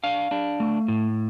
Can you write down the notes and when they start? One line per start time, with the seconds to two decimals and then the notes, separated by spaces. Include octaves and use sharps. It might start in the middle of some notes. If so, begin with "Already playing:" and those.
0.04 D4 F5
0.31 D4
0.60 A3
0.88 A2